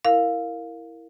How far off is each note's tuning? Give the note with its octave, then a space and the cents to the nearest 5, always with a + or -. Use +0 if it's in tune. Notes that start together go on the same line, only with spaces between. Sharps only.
E4 +0 A#4 -10 F5 +10